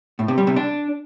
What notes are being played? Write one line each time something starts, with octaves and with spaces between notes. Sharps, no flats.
A2
C3
G3
C3
D4